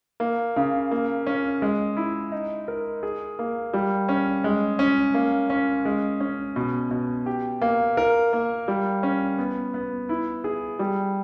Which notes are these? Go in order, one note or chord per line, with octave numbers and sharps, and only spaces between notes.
A#3
C#3
A#3
C#4
G#3
E4
D#4
A#4
G#4
A#3
G3
C#4
G#3
C#4
A#3
C#4
G#3
C#4
B2
B2
G4
A#3
A#4
A#3
G3
C#4
B3
B3
E4
G#4
G3